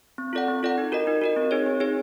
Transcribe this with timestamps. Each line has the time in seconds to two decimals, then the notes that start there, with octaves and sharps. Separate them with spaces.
0.18 C4
0.33 F4 A4 D5 F#5
0.48 C4
0.63 F4 A4 D5 F#5
0.78 D#4
0.92 F#4 A#4 D#5
1.07 D#4
1.21 F#4 A#4 D#5
1.36 C4
1.51 D#4 G#4 C#5
1.66 C4
1.80 D#4 G#4 C#5